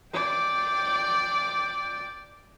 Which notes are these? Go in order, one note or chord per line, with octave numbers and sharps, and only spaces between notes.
D5 G5